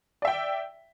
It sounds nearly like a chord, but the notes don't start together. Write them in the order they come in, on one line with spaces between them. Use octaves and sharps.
D5 E5 G5